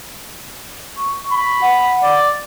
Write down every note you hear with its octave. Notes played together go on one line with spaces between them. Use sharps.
C#6
B5
F#5
D5